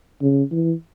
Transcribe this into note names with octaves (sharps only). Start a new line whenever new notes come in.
C#3
E3